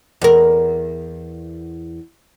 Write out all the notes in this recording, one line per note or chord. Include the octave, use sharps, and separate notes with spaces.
E2 A#4